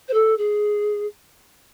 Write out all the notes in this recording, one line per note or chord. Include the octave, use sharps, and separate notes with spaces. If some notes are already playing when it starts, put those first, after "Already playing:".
C5
A4
G#4